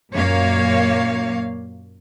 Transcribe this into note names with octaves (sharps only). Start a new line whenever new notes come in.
F#2 A#2 A#3 C#5 F5